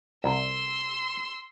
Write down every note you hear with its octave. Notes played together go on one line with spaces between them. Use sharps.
C2 C6 E6